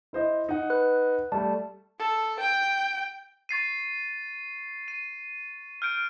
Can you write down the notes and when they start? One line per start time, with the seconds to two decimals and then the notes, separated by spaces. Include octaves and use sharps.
0.13 E4 C5 D#5
0.49 D#4 F#5
0.70 B4 F#6
1.32 G3 A3 A5
1.99 A4
2.40 G5
3.49 C#6 A6 C7 D#7
4.88 D#7
5.82 F6 G6 D7